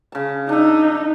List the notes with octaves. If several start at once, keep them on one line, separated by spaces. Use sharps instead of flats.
C#3 A5
D4 D#4 E5